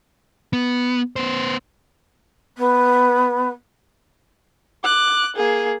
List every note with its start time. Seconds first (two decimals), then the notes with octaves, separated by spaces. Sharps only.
0.53 B3
1.16 B3 C5
2.57 B3
4.84 D6 F#6
5.36 A#3 G#4